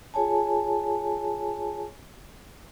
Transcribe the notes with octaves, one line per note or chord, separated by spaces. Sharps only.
F4 G#4 C#5 G#5 A5